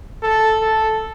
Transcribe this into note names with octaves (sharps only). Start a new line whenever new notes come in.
A4
A4